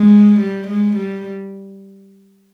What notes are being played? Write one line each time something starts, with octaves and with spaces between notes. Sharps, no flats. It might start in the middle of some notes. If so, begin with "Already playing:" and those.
Already playing: G#3
G3
G#3
G3